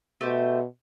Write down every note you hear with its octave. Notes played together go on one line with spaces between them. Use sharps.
B2 A3 G4 C5